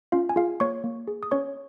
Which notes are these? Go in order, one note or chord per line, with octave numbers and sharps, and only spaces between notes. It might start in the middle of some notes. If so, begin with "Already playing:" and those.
C#4 F4 F5
G#5
F4 G#4 F5
A#3 C#5 C#6
A#3
G#4
D#6
C#4 C#5 C#6